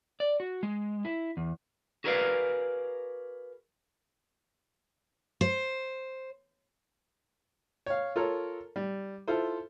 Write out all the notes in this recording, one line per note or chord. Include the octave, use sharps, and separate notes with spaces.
D5
F#4
G#3
E4
E2
F#4 G#4 A#4 B4 D5 F5
C5
C#5 F5
F4 A4 A#4 C#5
G3
E4 F4 A4 C5